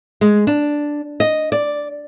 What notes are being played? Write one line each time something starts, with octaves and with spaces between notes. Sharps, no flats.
G#3
D4
D#5
D5